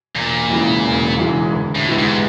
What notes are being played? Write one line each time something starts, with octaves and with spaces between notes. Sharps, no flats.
E1 A#2
E2 C#3 E3 G#3
E1
E2 C#3 E3 G#3
D2
A2
C3 E3 G#3 B3
G#2